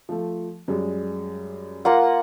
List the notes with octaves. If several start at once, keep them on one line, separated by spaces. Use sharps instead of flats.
F3 A3
F#2 G3 G#3
A#3 F4 F#5